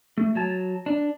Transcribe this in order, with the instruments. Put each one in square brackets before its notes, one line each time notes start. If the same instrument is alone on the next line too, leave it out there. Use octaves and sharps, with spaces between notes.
[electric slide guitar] A3
F#3 A5
D4